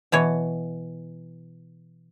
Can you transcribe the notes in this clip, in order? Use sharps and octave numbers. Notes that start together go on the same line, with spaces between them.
B2 E3 C#5